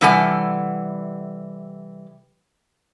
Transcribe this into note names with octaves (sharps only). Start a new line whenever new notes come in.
C3 E3 G3 A4 F#5 G#5